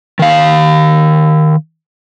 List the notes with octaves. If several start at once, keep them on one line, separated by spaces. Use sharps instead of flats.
D#3 F5